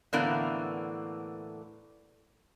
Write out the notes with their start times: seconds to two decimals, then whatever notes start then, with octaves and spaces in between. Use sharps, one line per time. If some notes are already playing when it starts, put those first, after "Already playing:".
0.13 A2 D3 E3 A#3 B3 D5